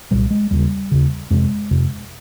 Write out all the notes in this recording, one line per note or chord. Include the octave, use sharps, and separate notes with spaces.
C2 A#2 G3
G#3
D#2 C#3 G3
D#2 C#3
F2 C3 G#3
F2 C3